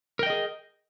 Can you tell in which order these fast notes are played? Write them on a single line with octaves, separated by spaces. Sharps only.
A#4 G5 D#5 G#4